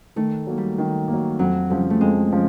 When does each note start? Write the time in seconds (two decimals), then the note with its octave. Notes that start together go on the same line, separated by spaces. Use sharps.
0.16 D#3 A3
0.47 F#3 A#3
0.58 G3
0.78 D#3
1.08 A#3
1.13 F#3
1.39 F2 F#3
1.70 C#3 F3 G3
1.90 A3
2.01 F2 G#3
2.31 C#3 F3